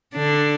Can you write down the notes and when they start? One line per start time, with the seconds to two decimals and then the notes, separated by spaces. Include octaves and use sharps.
0.16 D3 D4